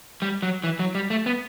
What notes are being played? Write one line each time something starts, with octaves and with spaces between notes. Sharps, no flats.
G3
F#3
E3
F#3
G3
A3
B3